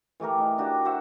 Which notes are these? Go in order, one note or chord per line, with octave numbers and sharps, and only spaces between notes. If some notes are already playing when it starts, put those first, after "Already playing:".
E3 A3 G4 A#4
D#4
D4 F#4 G4
F#4 C5 E5 F#5